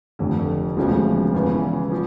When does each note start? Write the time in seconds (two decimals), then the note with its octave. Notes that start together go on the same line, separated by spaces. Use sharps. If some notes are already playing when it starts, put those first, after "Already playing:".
0.19 F1 F2 D3
0.77 E1 D2 C#3 F3
1.34 E2 C#3 E3
1.92 F3